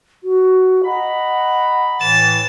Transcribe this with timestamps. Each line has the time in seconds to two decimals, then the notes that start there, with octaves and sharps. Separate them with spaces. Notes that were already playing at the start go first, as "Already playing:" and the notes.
0.24 F#4
0.85 D#5 F#5 A#5 B5
2.01 A2 E3 A6 E7